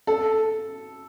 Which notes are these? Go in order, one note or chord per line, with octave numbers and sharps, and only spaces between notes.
A4